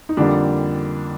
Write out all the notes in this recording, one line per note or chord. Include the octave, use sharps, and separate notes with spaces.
D#4
F2 D3 G3 A#3 D4